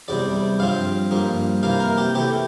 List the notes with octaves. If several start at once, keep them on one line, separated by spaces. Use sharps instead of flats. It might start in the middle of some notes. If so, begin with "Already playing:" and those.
E2 C3 G3 D5
G2 F3 C4 F5
G2 F3 A#3
C3 E3 A#3 F5
A#4
G4
C3 E3 A3 G4